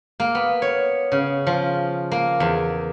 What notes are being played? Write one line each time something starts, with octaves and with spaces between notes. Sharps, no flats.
A#3
B3
C#5
C#3
F3
A#3
E2